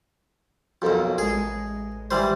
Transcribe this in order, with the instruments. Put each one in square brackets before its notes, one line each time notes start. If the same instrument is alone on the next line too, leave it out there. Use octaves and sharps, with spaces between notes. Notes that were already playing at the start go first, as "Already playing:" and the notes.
[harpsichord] B1 F2 [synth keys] F#4 A4 A#4
[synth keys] A1 G#3 [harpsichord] G#4
[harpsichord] E3 G3 C5